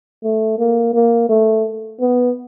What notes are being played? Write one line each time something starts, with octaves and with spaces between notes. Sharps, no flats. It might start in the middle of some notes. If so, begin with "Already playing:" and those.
A3
A#3
A#3
A3
B3